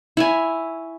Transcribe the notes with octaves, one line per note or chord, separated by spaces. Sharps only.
E4 C#5 G#5